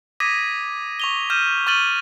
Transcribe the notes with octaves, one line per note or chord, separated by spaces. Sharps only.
D6 D#6 G#6 A#6 B6 D#7
C#6 F7 G7
F6 G6 D#7 E7
C#6 F6 A6 D#7 F#7 G7